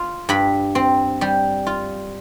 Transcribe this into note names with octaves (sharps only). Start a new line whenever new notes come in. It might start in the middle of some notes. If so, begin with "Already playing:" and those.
Already playing: F4
G2 B5
C4
G3
F4